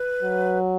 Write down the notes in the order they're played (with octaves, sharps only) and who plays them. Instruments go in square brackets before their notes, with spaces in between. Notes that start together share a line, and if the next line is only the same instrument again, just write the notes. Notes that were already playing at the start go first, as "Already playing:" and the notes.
Already playing: [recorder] B4
[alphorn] F#3